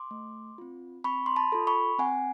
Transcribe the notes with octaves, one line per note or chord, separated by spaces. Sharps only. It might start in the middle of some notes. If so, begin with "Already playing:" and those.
Already playing: C6 D6
A3
C4 F4
C4 B5 C#6
C6
A5 B5
F4 A4
B5 C#6
C4 F#5 G#5